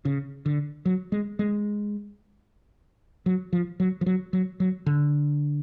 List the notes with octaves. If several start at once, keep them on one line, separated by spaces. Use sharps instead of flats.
C#3
D3
F#3
G#3
G#3
F#3
F3
F#3
F3
F#3
F#3
F#3
D3